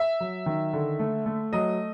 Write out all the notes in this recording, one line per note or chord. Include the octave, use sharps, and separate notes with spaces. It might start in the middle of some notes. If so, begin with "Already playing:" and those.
Already playing: E5
F#3
D#3
D3
A3
A3
F#3 D#5